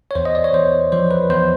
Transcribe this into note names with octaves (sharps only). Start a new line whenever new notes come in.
C#5
E2 C5
D#5
D5
C#5
E2 C5
F3 C5
B4
E2 C5